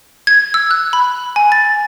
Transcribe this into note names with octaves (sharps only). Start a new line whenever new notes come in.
G#6
E6
F#6
B5
G#5
A6